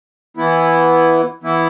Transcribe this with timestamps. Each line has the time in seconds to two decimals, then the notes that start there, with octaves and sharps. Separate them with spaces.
0.37 E3 B3 E4
1.42 E3 B3 E4